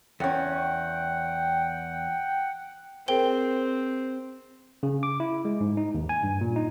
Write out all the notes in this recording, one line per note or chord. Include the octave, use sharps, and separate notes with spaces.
E2 C#4 F#5 G5
C4 G#4 A#4 C5 G5 G7
C#3
D6
E4
G#3
G#2
D#4
D#2
G#5
G2
A#2
D#4